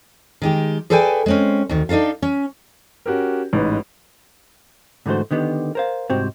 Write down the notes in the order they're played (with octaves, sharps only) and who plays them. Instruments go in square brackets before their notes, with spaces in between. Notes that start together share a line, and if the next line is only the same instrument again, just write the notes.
[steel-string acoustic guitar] D#3 G#3 G4
G#4 A4 B4 D5 G5 G#5
G#3 C4 C#4
D2 D#3
D4 D#4 F4 A4 F5
C#4
[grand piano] C#4 F#4 G4 A#4
A1 G#2 B4
[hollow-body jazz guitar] G#2 D3 E3 A3 F#4 C5
D3 D#3 B3 G4
A#4 C5 F5
C2 G#2 C4 F#4 G4 C5